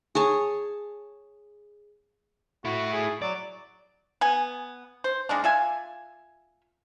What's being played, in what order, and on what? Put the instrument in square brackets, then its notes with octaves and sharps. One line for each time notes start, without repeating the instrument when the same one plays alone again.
[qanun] G#4 C#5 A5
[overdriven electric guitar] A3 E4 [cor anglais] F#4
[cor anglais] G#4
[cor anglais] F#3 [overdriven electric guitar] D5
[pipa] B3 G#5
C5
D#3 G#3 A#3 D4
F4 E5 G#5